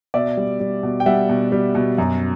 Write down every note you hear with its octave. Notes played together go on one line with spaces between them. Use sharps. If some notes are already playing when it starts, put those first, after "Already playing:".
B2 D5 E5
G3
G3
B2
G5
G3 E5 F#5
B2
G3
B2
F#2